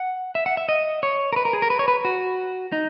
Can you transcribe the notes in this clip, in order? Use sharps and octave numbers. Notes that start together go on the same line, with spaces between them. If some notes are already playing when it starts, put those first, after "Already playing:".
Already playing: F#5
E5
F#5
E5
D#5
C#5
A#4
B4
A#4
G#4
A#4
B4
C#5
B4
F#4
D#4